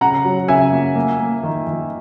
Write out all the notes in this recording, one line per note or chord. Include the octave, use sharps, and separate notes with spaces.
C#3 F#5 A#5
F#3
C#3 E5 G#5
A#3
A#3
A#3
D#3
D#3